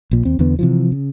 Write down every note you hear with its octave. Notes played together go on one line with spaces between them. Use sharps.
A#1 A#2
D#2 C4
E2 D3 B3
C3 E3 F3
C#3